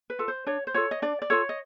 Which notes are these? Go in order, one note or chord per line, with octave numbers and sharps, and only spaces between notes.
B4
F4 A4
C5
D4 C#5
C5
F4 A4 C#5
D#5
D4 D5
D5
F4 A4 C#5
D#5